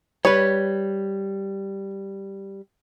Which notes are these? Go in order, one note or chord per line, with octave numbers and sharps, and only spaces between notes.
G3 B4 C#5